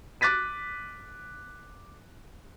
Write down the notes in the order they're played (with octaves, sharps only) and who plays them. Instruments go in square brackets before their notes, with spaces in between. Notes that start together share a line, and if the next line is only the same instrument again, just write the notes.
[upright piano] D6 F#6 A6 B6 D#7